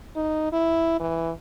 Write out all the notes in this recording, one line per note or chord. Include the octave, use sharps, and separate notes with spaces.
D#4
E4
E3